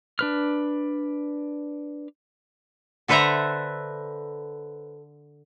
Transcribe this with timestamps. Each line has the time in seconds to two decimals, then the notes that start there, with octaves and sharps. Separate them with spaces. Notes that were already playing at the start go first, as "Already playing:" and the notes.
0.19 D4 B4 F6
3.08 D3 A4 B4 C5 E5 A#5